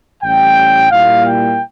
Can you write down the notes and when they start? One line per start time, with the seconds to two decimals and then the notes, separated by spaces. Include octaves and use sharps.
0.23 A1 A2 G3 C#4 G5
0.91 A#2 G3 A#3 E4 F5
1.26 G5